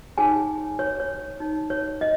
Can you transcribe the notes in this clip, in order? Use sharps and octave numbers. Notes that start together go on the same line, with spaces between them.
D#4 G#4 C#5 G#5
C#5
C#5
D#4 C#5
C#5
D#5